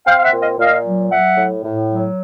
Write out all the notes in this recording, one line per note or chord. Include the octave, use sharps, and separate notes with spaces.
C4 F5 G5
F5
E5 F#5
A#2
D#5 F5
A#2 D#5 F5
F#3
F#3 E5 F#5
A2
A2
F#3